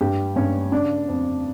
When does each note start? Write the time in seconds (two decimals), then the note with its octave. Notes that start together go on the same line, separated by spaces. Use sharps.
0.01 G2 G4
0.36 G2 C#4
0.72 C#3 D4
1.08 F2